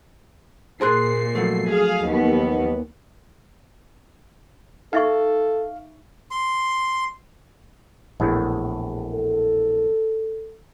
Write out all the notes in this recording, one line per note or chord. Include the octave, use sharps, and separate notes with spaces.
A#2 G#4 A#4 C5 C6 F#6 C7
F3 F#3 A3
G#4 F5
D#2 B3
D#4 A4 E5 F5 C#6
C6
A#1 E2 A2
A4